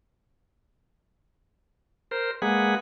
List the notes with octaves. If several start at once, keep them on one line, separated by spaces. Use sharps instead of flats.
A#4 C5
G#3 A#3 G#4 B4 F#5